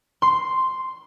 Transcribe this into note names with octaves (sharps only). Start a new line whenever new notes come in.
C6